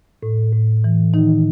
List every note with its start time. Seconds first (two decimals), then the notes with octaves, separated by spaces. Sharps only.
0.23 A2
0.53 A2
0.84 E3
1.14 D#3 D#4